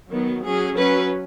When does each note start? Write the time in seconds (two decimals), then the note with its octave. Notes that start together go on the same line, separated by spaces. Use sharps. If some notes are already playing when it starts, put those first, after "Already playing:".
0.11 D#3 F#3 B3
0.44 F#3 C#4 G#4
0.78 F#3 C#4 B4